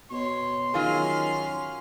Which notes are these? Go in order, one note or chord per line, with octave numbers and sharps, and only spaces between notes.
B2 C#5 C6
D#3 F#3 C#4 F4 G#4 F6